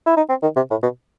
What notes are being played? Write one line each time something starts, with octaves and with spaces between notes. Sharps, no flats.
E4
D#4
C4
D#3
C3
A2
B2